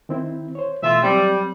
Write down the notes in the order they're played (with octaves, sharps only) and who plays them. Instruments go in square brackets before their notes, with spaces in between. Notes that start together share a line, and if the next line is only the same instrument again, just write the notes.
[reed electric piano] D#3 C4 E4
C5 C#5
[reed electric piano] B2 E3 A3 [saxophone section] F4 E5
[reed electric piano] F#3 C4 [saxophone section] G3